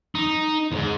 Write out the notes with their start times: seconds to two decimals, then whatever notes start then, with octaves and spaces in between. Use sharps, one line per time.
0.15 D#4
0.71 E2 G#2